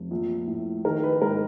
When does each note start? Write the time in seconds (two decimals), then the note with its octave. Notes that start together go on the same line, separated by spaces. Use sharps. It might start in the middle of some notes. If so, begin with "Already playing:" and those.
Already playing: F1
0.11 A#1
0.47 A2
0.85 D#3 A#4
1.03 B4
1.21 G#2 A#4